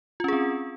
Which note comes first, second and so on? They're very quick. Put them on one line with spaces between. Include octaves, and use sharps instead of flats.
F4 C#4 G#4 C4